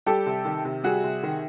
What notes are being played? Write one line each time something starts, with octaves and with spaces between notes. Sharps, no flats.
G3 G4 A4
C3
D#3
C3
G3 F#4 G#4
C3
D#3